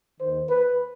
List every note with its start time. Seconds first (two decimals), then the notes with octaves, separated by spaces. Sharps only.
0.20 D#2 D#3 C5
0.50 B4